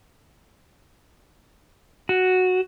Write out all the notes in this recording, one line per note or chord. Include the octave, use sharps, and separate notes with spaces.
F#4